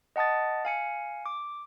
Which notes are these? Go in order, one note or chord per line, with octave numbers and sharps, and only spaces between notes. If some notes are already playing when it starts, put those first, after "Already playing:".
D#5 F#5 A5 D#6 A6
F5 G#5 C#7
D6